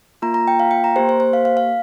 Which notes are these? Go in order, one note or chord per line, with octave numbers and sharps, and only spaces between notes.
A#3 F4 A#5
A#5
G5
F5
G5
A#5
A#3 G4 C5
C5
C5
F5
F5
F5